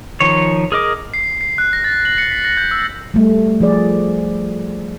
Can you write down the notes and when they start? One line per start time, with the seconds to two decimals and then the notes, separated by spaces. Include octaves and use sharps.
0.20 D#3 F3 C#5
0.72 G#4 A#4 D#5 D6
1.14 C7
1.41 C7
1.58 F#6
1.73 A#6
1.84 A6
2.05 F#7
2.18 C#7
2.31 B6
2.45 A#6
2.57 G6
2.71 E6
3.14 G3 A3
3.61 F3 G#4 D5